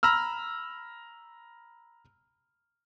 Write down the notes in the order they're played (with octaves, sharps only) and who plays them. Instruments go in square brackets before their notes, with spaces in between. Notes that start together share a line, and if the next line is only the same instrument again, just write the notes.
[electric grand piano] A#5 B5 E6 F6